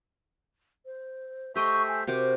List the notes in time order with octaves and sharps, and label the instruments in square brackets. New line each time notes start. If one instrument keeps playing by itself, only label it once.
[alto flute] C5
[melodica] A3 C5 E5 [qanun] G4 D#5 G5 [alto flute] C#6
[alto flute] G#5
[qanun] C3 F#4 D6 [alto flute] A#4 [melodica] C5